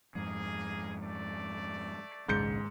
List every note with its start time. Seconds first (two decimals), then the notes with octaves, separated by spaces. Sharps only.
0.15 F2 G#2 A#3 G#4
1.02 A3 D5
2.29 A#1 D#2 G#2 C#3 G6 C#7